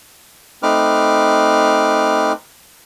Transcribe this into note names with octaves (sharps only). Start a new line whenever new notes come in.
A3 C4 D#4 B4 D6 F6